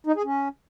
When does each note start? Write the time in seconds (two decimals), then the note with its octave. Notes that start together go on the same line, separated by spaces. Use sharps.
0.07 D#4
0.16 G#4
0.25 C#4